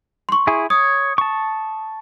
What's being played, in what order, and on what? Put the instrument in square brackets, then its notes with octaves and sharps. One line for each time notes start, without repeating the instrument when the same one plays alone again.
[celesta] C6 C#6
[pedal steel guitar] E4 G#4
[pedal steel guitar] C#5 [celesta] D#6
[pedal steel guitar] A5 C#6